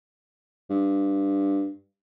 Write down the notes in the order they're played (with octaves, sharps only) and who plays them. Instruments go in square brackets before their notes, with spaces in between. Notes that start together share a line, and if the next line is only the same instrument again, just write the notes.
[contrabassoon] G2